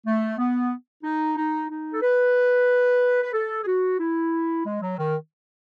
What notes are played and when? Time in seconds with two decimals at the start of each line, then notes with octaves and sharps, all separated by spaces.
0.06 A3
0.37 B3
1.03 D#4
1.37 D#4
1.70 D#4
1.92 A4
2.02 B4
3.22 B4
3.33 A4
3.62 G#4
3.66 F#4
3.98 E4
4.65 G#3
4.81 F#3
4.97 D#3